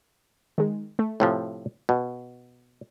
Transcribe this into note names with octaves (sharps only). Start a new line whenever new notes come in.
D#3 G#3
A3
A2 C3 F3
B2